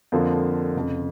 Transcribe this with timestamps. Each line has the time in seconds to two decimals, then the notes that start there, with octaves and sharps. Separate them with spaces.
0.12 F2 D3 F3 A#3
0.75 F1 F2 C#3